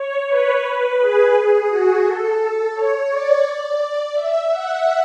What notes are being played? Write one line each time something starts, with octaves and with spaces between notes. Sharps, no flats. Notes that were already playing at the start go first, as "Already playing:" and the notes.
Already playing: C#5
B4
G#4
F#4
A4
C#5
D5
E5
F#5